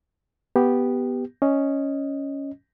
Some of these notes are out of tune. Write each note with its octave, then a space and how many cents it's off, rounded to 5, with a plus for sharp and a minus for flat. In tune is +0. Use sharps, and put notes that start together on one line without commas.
B3 +0 G4 +0
C#4 +0 D#5 +0